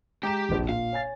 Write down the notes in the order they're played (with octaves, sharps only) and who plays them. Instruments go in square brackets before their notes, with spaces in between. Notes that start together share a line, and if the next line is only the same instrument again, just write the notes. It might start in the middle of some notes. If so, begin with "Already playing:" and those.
[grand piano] G#3 A#5 E7 [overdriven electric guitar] G4 G5
[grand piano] F1 A#1
[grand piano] A#2 [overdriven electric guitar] F5
[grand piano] C#5 G#5 A6